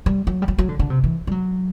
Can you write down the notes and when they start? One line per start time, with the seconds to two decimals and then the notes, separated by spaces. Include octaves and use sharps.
0.06 G3
0.27 F#3
0.42 G3
0.48 F#3
0.59 F#3
0.69 D3
0.79 D3
0.90 C3
1.04 E3
1.27 G3
1.31 F#3